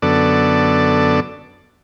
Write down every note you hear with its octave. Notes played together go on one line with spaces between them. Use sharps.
F#2 D3 B3 A4 D5